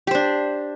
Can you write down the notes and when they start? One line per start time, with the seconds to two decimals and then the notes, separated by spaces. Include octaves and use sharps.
0.07 G4
0.11 C5
0.15 D4